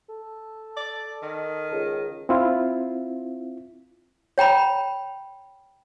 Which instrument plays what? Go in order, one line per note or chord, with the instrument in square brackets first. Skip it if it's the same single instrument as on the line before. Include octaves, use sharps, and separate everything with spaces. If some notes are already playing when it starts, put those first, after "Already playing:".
[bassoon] A4
[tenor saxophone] D5
D#3
[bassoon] C#2
[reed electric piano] C4 E4 F4
[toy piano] C#5 G5 A#5 B5